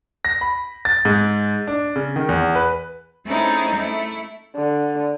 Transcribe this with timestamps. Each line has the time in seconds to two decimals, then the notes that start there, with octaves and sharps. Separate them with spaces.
0.25 A#6
0.41 B5
0.85 A6
1.05 G#2
1.67 D4
1.96 C#3
2.16 D#3
2.29 E2
2.55 B4
3.26 A3 C4 C#4 D#4 E4 G#4
3.74 A3 E4
4.56 D3